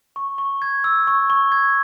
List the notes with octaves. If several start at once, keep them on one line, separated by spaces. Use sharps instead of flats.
C#6
C#6
G#6
E6
C#6
C#6
G#6